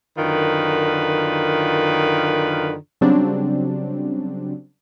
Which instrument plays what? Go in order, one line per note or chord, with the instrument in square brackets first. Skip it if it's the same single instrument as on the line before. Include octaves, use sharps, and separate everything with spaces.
[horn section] F#2 D3 D#3 F4 B4
[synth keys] C#3 F#3 G3 C4 D4